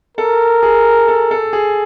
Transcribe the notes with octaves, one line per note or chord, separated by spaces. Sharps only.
A4 A#4
G#4
A4
A4
G#4